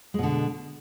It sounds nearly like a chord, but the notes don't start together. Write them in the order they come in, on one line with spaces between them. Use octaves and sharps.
G#3 B2 D3